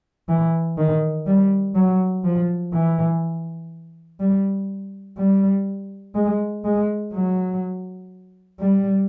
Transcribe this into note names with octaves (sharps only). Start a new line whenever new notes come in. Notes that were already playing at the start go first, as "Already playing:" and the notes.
E3
D#3
G3
F#3
F3
E3
G3
G3
G#3
G#3
F#3
G3